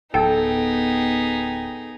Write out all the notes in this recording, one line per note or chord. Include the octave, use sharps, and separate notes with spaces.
D1 B3 D#4 G#4 A4 G5